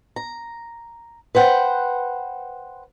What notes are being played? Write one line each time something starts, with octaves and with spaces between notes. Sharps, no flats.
A#5
B4 C5 F#5 G5